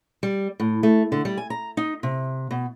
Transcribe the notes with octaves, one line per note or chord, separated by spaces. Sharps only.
G3
A2
A3
D3
G3
G#5
A#5
D#4
C3
B2